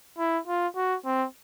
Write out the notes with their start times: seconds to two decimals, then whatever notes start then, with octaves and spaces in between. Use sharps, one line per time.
0.19 E4
0.47 F4
0.76 F#4
1.05 C4